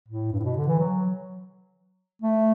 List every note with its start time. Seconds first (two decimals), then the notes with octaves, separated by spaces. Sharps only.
0.08 A2
0.32 G2
0.39 A2
0.44 B2
0.56 D3
0.67 E3
0.80 F#3
2.22 A3